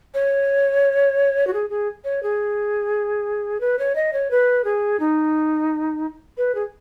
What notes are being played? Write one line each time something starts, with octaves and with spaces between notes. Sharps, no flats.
C#5
F#4
G#4
G#4
C#5
G#4
B4
C#5
D#5
C#5
B4
G#4
D#4
B4
G#4